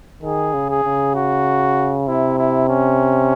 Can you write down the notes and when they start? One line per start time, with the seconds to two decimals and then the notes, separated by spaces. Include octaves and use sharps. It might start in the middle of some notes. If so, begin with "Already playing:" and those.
0.23 D#3 G#4
0.54 C#3
0.70 G#4
0.85 C#3
1.15 F#4
2.08 C3 E4
2.38 E4
2.69 C#4